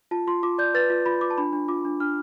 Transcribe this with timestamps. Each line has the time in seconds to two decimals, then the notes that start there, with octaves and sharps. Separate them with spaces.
0.11 F4 A5
0.27 F4 C6
0.43 F4 D6
0.58 D5 G6
0.74 B4 A6
0.90 F4
1.06 F4 B5
1.21 F4 D6
1.30 A5
1.38 D4 B5
1.53 D4
1.68 F4 D6
1.85 D4
2.00 D4 F6